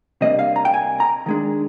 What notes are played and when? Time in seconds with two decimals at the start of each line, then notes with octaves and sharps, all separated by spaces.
0.21 C3 G3 A#3 D4 D#5
0.39 F5
0.56 A#5
0.65 G5
0.74 G#5
1.00 A#5
1.26 D#3 G#3 D4